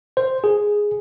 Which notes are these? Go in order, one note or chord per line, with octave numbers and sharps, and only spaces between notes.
C5
G#4